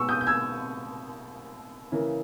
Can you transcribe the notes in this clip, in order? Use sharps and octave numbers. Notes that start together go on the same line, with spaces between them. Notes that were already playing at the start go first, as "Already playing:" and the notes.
Already playing: B2 G#3 B3 C#6 E6
D#6 G6
G6
E6 G#6
C#3 E3 A#3